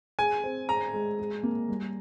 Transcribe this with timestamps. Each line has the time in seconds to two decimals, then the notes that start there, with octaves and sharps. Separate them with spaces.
0.19 G#4 G#5
0.44 C4
0.69 G#4 A#5
0.93 G#3
1.19 G#4
1.43 A#3
1.69 G3